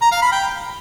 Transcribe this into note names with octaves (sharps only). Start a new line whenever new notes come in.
A#5
F5
B5
G5